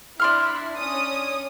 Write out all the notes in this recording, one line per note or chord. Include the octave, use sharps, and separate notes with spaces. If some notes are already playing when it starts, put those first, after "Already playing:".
D4 E4 C6 F6
C#4 D#6